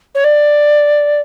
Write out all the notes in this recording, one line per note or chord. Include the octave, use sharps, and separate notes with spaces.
C#5
D5